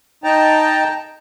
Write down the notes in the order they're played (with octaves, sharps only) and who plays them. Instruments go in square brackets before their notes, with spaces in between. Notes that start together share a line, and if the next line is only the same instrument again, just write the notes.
[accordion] D#4 G5 A5 A#5